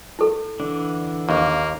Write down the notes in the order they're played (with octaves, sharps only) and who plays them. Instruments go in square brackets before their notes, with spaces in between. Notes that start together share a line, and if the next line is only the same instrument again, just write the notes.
[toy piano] E4 A4
[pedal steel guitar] D3 E3 D4
[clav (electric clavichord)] D#2 [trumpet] A#3